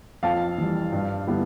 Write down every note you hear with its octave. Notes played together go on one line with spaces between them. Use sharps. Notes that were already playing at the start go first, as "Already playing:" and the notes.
F2 F5 A5
E3 G3
G2
D3 G3 B3 E4